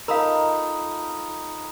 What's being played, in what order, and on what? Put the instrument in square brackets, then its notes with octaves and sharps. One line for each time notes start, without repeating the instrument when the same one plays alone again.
[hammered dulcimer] D#4 F4 A4 [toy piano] A#4 F5 [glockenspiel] A#5 B5 D#6